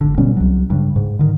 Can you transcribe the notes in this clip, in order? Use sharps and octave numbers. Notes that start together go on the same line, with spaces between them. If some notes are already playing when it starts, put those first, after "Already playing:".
G#1 D3
B2 G3 B3 C#4
C2 F#3
G2 C#3
G#2
D3 D#3